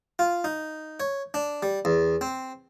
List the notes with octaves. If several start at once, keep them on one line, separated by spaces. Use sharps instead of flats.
F4
D#4
C#5
D4
G3
E2
C4